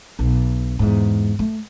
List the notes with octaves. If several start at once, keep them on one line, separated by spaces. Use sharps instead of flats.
B1
E2 G#2
A3